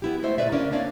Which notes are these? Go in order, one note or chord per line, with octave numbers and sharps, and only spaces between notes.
B3 E4 G4
G#3 A3 E4 C5 E5
A#2 F#3 A3 B4 D5 E5
C#3 C#4 D4 A#4 D5 F5
A#3 C4 D4 C#5 D5 F5